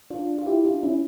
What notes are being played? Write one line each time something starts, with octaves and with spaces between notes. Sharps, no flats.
D4 F4
F4
E4 G4
D4 F4
C#4 E4